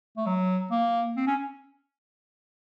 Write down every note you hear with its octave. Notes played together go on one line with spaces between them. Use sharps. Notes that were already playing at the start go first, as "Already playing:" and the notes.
A3
F#3
A#3
C4
C#4